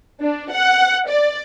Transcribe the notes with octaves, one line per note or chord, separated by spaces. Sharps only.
D4
F#5
D5